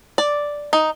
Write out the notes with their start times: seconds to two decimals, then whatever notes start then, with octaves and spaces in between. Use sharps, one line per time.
0.18 D5
0.73 D#4